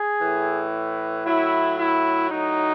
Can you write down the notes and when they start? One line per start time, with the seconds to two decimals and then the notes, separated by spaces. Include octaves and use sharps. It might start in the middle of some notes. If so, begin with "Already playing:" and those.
Already playing: G#4
0.22 A2 E3
1.26 A2 F#3 E4
1.79 E4
2.31 A2 F#3 D#4